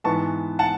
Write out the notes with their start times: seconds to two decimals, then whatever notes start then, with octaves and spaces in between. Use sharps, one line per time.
0.04 G#2 E3 B3 A5 C#6
0.59 F#5 A5